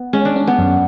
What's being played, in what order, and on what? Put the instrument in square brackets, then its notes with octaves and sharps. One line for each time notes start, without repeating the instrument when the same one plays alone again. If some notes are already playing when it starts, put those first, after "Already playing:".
Already playing: [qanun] B3
[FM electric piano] G#3 [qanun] C#4
[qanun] D4
[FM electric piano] C#4
[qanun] B3
[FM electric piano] F#2